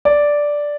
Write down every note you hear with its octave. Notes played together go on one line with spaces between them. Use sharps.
D5